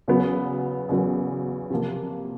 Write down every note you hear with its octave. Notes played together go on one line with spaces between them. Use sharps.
E2 C#3 F#3 B3
E2 C#3 F#3 B3
C3 F3 A#3